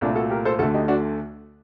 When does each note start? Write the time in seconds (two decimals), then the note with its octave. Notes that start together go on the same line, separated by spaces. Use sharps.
0.01 C2 A#2 A3 D4
0.15 F#4 A4
0.30 G4 A#4
0.45 A4 C5
0.59 D2 D3 A3 F#4 A4
0.74 D#4 G4
0.88 D4 F#4